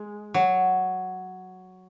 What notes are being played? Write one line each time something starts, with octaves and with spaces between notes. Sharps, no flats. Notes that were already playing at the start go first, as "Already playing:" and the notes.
Already playing: G#3
F#3